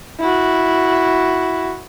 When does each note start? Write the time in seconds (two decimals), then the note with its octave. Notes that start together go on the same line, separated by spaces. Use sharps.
0.20 E4 F#4